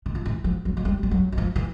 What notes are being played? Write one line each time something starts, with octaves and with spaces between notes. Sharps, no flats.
D#3
F3
E3
F3
F#3
F#3
G3
G3
F#3
F#3
F3
E3